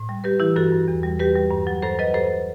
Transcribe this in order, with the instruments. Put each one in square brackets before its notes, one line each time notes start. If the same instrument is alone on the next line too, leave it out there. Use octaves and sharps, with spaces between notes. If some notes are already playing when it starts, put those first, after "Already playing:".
Already playing: [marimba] A2
G3
G3 G4 B4
E3 E4 G4
G2 F#4 A4
G2
E2
G3
G3 G4 B4
G3
G2
F#3
G2 A4 C5
F#3 B4 D#5
G2 A4 C5